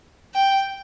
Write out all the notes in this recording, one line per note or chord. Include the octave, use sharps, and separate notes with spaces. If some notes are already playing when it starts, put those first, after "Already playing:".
G5